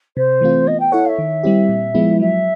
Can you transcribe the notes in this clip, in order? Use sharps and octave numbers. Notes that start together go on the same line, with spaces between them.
C3 C5
E3 A3 C4 F4
B3 D#5
G5
E4 A4 C#5 F#5
F5
E5
D#3
G3 C4 E4 G4
A#2
F3 G#3 B3 E4
F#3 E5